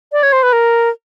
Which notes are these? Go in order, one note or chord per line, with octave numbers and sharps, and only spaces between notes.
D5
C#5
C5
B4
A#4